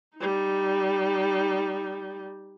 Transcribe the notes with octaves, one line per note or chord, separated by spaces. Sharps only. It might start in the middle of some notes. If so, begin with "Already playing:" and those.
G3 D#4